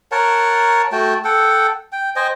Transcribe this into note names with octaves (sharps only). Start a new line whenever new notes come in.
A#4 C#5 F#5 A5
A3 F#4 G5 A5
A4 F#5 G5
G5
C5 D#5 G5 G#5